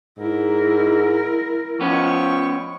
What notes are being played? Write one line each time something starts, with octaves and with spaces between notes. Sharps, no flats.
G#2 E4 A#4
F3 B3 C#4 D#5 G5 C#6